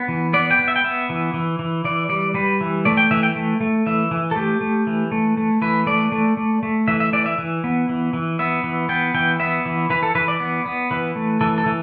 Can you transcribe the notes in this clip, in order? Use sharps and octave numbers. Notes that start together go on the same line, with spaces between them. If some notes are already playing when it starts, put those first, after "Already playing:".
Already playing: B3
E3
B3 D5
G5
B3
E5
G5
B3 E5
E3
E3
E3
E3 D5
G3 D5
G3 B4
E3
A3 D5
G5
E3 E5
G5
A3
A3
E3 E5
E3
A4
A3 G4
A3
E3
A3
A3
E3 B4
A3 D5
A3
A3
A3
E3 E5
E5
E3 D5
E5
E3
B3
E3
E3
B3 E5
E3
B3 G5
E3 G5
B3 E5
E3
E3 B4
A4
E3 B4
D5
B3
B3
E3 B4
A3
E3 A4
A4
E3